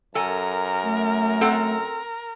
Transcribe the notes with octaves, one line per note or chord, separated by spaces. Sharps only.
F#2 A4 A#4 G#5
A3
C4 A4 F#5